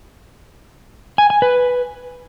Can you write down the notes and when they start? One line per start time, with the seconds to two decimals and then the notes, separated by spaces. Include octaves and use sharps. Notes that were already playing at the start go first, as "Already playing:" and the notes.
1.18 G#5
1.30 G#5
1.42 B4